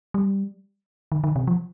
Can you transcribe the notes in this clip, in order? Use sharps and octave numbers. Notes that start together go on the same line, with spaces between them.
G3
D#3
D#3
C3
F3